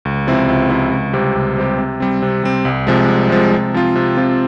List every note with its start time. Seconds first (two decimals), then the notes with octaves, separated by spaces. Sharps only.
0.05 C#2
0.27 C3 F3 C4 E4
0.49 C#2
0.70 C3 F3 C4 E4
0.92 C#2
1.13 C3 G3 C4 G4
1.35 C#2
1.57 C3 G3 C4 G4
1.79 C3
2.00 G3 C4
2.22 C3
2.44 G3 C4
2.65 C2
2.87 C3 F3 G#3
3.08 C2
3.30 C3 F3 G#3
3.52 C3
3.74 F3 C4 F4
3.96 C3
4.17 F3 C4 F4